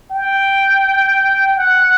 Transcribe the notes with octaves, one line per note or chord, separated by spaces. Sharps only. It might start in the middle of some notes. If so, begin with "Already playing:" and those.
G5
F#5